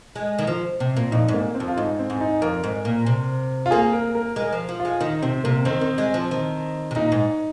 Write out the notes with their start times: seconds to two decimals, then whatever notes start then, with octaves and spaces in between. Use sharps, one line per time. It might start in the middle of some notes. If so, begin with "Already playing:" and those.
0.15 G#3
0.39 D#3
0.47 F3
0.80 C3
0.96 A#2
1.12 F2 D#4
1.28 G#2
1.34 A#3
1.55 C4
1.60 F2
1.68 F4
1.77 G#2 D#4
1.99 C4
2.10 G#2
2.21 D#4
2.42 F2 A#4
2.64 G#2
2.85 A#2
3.06 C3
3.66 F4
3.71 A#3 G#4
3.93 A#4
4.15 A#4
4.36 G#3 A#4
4.52 F3
4.69 F3
4.80 F4
4.85 G#3
5.00 D#3 D#4
5.22 C3 C4
5.44 C3 A#3
5.65 D#3 C4
5.81 D#3
5.98 G#3
6.14 F3
6.31 D#3
6.91 C3
6.95 A#2 D#4
7.12 G#2